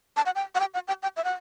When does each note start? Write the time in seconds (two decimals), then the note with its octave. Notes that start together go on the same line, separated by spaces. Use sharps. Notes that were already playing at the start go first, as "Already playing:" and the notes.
0.17 A5
0.26 F#5
0.35 G5
0.55 F#5
0.60 G5
0.74 F#5
0.88 G5
1.03 G5
1.17 E5
1.24 F#5